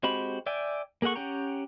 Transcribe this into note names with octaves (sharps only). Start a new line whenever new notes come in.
G#3 C4 F#4 G4 B5
D5 E5 G5 G#5
A#3 G#4 A4 F#5 C#6
C#4 G4 F#5 G5 A#5